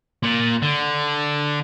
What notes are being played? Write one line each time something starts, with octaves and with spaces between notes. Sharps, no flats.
A#2
D3